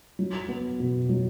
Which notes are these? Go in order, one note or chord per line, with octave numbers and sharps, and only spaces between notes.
F#3
B3
B2
F#3